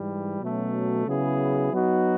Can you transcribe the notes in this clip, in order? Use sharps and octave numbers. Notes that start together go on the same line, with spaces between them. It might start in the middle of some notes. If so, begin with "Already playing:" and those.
Already playing: G#2 E3 G3
B2 F#3 A3 C#4
C#3 F#3 B3 E4 G#4
F#3 B3 D#4 F#4